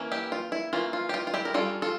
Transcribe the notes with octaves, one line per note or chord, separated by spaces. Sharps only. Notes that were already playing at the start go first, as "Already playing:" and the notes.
Already playing: E3 A#3 C#4
E4 G4
F4
E4
E3 A#3 C#4 F4
F4
G4
F4
F4
E4 G4
A#4
G3 C#4 F4 A4
F4 A4